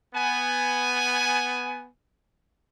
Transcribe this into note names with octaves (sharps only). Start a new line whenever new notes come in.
B3 G#5